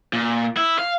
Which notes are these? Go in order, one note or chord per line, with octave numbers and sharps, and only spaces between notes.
A#2
E4
F5